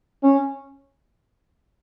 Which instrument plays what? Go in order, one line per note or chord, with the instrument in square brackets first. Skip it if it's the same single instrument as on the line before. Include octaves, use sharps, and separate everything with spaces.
[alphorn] C#4